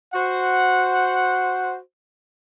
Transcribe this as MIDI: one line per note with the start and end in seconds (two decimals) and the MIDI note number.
0.13 1.76 66
0.13 1.76 72
0.13 1.76 78